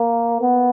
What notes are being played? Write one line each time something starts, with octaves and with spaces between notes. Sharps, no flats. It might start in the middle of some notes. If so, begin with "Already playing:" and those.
Already playing: A#3
B3